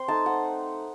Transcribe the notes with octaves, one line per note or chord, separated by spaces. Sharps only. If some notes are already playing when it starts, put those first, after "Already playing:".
Already playing: C4 C6
A3 D#4 A5
F#5